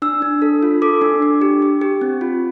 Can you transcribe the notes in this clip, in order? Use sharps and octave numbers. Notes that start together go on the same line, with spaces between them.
D4 E6
D4
A4
F4
A4 D6
D4
D4
G4
G4
G4
C4
F4